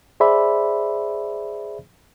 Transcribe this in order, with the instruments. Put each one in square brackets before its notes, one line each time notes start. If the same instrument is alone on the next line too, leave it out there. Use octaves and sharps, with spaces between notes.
[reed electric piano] G#4 C5 D5 E5 B5